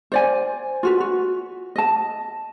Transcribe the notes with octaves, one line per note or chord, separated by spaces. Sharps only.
C5 D5 G#5
F4 F#4 B4
F#4
D#5 A5